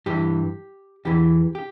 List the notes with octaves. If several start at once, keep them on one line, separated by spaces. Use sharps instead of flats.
G2 E3 G4
E2 E3 G4
G4